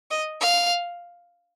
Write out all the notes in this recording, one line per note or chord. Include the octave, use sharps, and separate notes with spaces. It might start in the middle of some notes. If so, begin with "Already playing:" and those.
D#5
F5